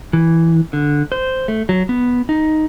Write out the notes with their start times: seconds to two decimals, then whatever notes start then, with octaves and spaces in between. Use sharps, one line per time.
0.13 E3
0.73 D3
1.12 C5
1.48 A3
1.69 F#3
1.89 B3
2.29 D#4